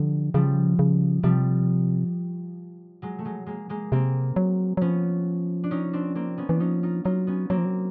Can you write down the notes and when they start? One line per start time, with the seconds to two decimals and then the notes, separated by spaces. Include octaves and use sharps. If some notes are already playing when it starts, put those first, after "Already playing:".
Already playing: D3 F3 G3
0.34 C#3 F3 G3
0.79 C#3
1.23 C3 F3 G3
3.02 F#3 G#3
3.19 A3
3.25 F#3 G#3
3.46 G#3 A#3
3.69 G#3 A#3
3.92 C3 A#3 C4
4.36 F#3
4.77 F#3
4.81 F3 B3 C#4
5.64 D4
5.71 C#4 D#4
5.93 C4 D4
6.15 A#3 C4
6.38 B3 C#4
6.49 E3 D4
6.60 F3 C#4 D#4
6.83 D#4 F4
7.05 F#3 D#4 F4
7.27 B3 C#4
7.50 F#3 A#3 C4
7.58 F3
7.65 F#3